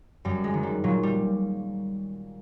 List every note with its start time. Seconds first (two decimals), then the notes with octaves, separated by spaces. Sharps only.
0.25 F#2 G3
0.44 G#3
0.54 D#3
0.63 G3
0.84 A#2 F#3
1.03 G3